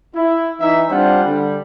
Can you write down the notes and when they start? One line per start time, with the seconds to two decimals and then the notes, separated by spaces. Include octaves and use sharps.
0.14 E4
0.60 E3 D#4 E4 E5
0.89 G3 C4 D4 F4 C5 F#5
1.24 D3 G3